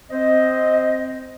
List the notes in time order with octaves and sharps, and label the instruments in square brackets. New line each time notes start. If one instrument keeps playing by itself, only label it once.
[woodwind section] C4 C5 D#5